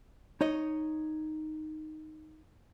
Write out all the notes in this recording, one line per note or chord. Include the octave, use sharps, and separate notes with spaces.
D#4 C#5 D#5